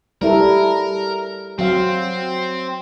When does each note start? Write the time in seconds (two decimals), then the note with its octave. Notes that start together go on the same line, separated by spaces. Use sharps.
0.22 G3 E4 A4 A#4
1.59 F#3 C4 F5